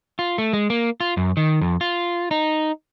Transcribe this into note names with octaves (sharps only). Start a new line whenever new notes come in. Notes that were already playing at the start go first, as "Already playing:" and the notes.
F4
A3
G#3
A#3
F4
F#2
D#3
F2
F4
D#4